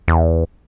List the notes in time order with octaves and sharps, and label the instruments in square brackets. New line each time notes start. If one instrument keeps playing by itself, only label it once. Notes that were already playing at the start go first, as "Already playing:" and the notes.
[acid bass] E2